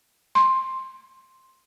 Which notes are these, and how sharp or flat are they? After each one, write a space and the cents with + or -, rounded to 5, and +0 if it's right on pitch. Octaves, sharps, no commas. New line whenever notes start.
C6 +10